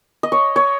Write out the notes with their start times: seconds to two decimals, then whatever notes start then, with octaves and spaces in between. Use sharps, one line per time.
0.23 D#5
0.32 C#5
0.56 C#5